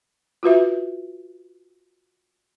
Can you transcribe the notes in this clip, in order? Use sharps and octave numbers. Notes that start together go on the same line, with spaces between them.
F4 F#4 B4 E5